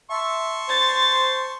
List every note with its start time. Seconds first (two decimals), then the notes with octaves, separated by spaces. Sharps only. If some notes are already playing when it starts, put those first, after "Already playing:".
0.11 E5 A5 C6 C#6
0.69 C5 A6